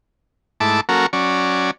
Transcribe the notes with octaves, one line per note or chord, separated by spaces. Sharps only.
G#2 A3 E4 A5 D6
F#3 A#3 C#4 F#4 A4 A#4
F#3 C#4 D5